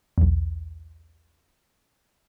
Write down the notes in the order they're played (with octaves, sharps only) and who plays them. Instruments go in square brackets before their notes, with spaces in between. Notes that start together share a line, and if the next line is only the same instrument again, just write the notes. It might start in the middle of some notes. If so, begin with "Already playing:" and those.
[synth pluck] B1 E2